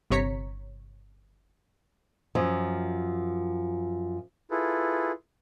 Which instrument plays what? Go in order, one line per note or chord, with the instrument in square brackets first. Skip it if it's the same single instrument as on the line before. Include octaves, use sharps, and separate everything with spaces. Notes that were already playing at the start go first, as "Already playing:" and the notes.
[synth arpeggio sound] G1 C3 C#5 A#5 B6 C#7
[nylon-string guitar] F#2 F3
[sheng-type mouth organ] E4 F4 G#4 A4 B4